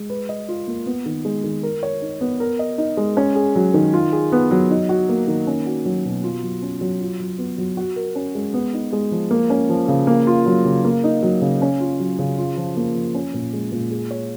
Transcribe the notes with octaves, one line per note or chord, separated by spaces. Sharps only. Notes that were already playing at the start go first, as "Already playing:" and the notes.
Already playing: G#3
B4
D#5
F4
A#3
B3
D#3
G#3
D#3
A#4
C#5
D#4
B3
A#4
D#5
D#4
G#3
C#4
G#4
F#3
D#3
F4
G#4
B3
F#3
D#4
F#4
A#3
D#3
C#4
F#4
F#3
B2
F4
F#3
C#4
F#3
F4
F#3
B3
F#3
F#4
A#4
C#4
G#3
B3
D#4
G#3
F3
A#3
C#4
F3
C#3
A#3
F4
F#3
C#3
A#3
D#4
F#3
C#3
C#4
F4
F#3
C#3
F4
F3
A#3
F3
C#4
A#2
G#3
A#2
G#4
C#5